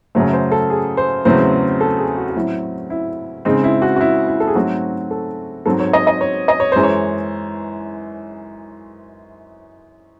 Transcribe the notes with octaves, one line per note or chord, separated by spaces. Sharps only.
F#2 C#3 F#3 A3 C5
C5
A4
G#4
C5
E2 C#3 F#3 A3 C4 C5
A4
G#4
F#4
F#4
A2 F#3 C4 E4
E4
C#3 G#3 C4 D#4
E4
F#4
F#4
E4
E4
A4
G#4
G#2 F#3 A3 C4 F#4
A4
G#2 F#3 C4 A4
C#5
D#5
D#5
C#5
D#5
C#5
F#2 E3 G#3 C5
C#5